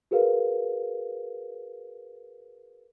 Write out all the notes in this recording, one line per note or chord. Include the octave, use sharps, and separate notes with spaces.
F#4 G#4 A#4 B4 F5